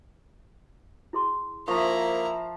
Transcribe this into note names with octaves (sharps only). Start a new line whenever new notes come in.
E4 G#4 C6
F3 A#3 E4 A#5 C#6